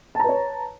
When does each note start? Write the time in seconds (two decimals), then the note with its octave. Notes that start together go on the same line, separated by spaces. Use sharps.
0.15 A5
0.20 A#5
0.24 B4
0.29 C#5